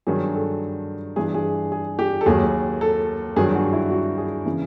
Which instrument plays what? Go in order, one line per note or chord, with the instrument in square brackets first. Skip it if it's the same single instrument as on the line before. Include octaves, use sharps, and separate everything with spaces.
[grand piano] G2 D#3 F#3 G#4
A4
G2 E3 G#4
G#4
G#4
G4
A4
D#2 D#3 F#3 G#4
A4
G2 D#3 F#3 G#4
F#4
E4
F#4
G#4
C#3 E3